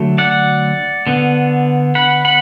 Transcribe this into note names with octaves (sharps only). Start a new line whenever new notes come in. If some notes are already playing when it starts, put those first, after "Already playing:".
Already playing: D3 F#3 A3
D5 F#5
D3 B3
F#5 B5
F#5 B5